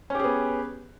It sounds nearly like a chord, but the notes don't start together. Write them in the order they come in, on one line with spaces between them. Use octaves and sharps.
C#4 G4 G#4 B3